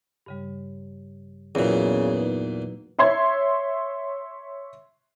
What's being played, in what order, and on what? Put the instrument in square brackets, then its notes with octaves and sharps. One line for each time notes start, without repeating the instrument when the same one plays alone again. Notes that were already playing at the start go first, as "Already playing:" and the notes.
[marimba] G2 C#3 G3
[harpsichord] E2 A#2 [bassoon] C#3 [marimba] F#3 B3 F#4
[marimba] D#4 B4
[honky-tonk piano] C#5 E5 C6 G#6